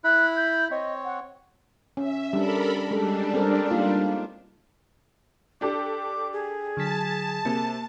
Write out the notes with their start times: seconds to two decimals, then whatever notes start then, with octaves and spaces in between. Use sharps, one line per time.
0.04 E4 B5 F#6
0.36 G6
0.71 C4 C#5 D#5
1.05 F#5
1.97 C#4 E5
2.33 G3 D4 A4 A#4 B5
2.91 G3 G#3 D4 A4
3.34 C4 A4 A#4
3.71 A#3 D#4 F4
5.61 D4 G4 A4 D6
6.33 G#4
6.77 D3 F#3 A5 B6
7.45 C3 A#3